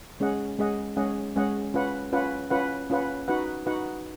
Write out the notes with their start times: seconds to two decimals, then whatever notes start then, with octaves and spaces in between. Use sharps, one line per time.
0.20 G#3 C#4 G#4 D#5 F#5
0.59 G#3 C#4 G#4 D#5 F#5
0.97 G#3 C#4 G#4 D#5 F#5
1.36 G#3 C#4 G#4 D#5 F#5
1.74 C#4 F4 B4 F#5
2.13 C#4 F4 B4 F#5
2.50 C#4 F4 B4 F#5
2.90 C#4 F4 B4 F#5
3.28 D#4 F#4 B4 F#5
3.66 D#4 F#4 B4 F#5